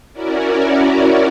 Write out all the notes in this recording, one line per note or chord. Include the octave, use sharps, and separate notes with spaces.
C#4 E4 F#4 A#4 D5